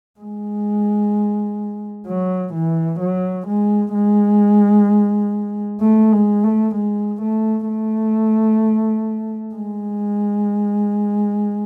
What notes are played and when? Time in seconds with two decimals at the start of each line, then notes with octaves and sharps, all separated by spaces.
0.20 G#3
2.07 F#3
2.54 E3
3.01 F#3
3.47 G#3
3.94 G#3
5.81 A3
6.12 G#3
6.43 A3
6.75 G#3
7.22 A3
7.68 A3
9.55 G#3